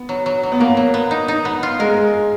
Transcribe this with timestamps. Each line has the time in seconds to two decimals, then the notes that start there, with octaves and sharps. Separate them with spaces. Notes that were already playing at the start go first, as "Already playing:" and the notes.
Already playing: B3
0.09 F#3
0.26 F#3
0.43 F#3
0.52 B3
0.60 F#3 A#3
0.77 F#3
0.94 B3
1.11 D#4
1.28 D#4
1.45 B3
1.63 F4
1.79 G#3 A#4